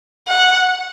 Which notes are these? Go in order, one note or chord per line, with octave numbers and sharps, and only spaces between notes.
F#5